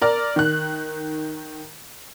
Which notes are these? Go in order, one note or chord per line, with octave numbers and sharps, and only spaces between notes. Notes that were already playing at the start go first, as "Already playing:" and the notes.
A#4 D5 F6
D#3 F#6